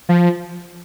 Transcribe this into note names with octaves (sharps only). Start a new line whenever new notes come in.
F3